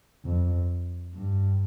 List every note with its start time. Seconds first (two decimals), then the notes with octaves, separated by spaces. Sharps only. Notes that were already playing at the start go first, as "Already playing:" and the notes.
0.25 F2
1.15 G2